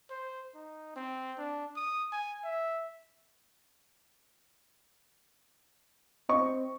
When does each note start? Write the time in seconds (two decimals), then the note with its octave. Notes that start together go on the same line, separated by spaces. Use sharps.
0.10 C5
0.55 D#4
0.96 C4
1.38 D4
1.76 D#6
2.12 G#5
2.44 E5
6.29 C4 D#5 C#6